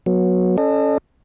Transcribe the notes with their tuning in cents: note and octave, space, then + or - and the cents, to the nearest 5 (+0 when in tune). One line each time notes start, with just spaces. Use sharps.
F#3 -15 B3 -25
C#4 +0 A4 +0 D#5 -40